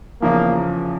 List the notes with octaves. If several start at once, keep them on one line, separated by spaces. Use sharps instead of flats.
E2 C#3 F3 A#3